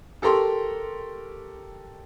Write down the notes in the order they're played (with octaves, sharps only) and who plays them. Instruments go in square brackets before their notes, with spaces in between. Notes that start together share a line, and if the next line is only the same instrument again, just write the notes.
[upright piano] G4 A4 A#4 A#5 C6 C#6